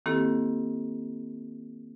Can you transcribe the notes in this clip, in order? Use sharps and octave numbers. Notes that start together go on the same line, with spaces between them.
D#3 A#3 C4 E4 G4 A4